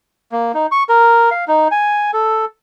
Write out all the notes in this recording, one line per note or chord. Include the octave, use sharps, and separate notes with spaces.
A#3
D#4
C#6
A#4
F5
D#4
G#5
A4